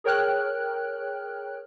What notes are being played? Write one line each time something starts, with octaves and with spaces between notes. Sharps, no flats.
G#4 A#4 C#5 G5 F6 F#6